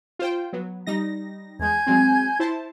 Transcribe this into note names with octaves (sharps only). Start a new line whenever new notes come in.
F4 C5 G5
F#3 B3
G3 D#4 A#6
E2 G#3 G#5 G6 G#6
F#3 G#3 C4
E4 C5 A5